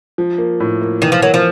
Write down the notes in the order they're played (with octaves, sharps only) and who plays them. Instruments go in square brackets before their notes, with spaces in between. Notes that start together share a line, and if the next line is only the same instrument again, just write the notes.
[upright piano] F3
A#3
A2
A#3
[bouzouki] D#3 [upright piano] E3
[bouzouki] F3
[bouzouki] F#3 [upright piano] A#3
[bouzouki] F3